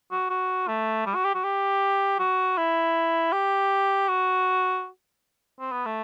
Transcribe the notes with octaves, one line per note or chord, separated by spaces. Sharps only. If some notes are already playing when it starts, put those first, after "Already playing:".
F#4
F#4
A3
G3
F#4
G4
F#4
G4
F#4
E4
G4
F#4
C4
B3
A3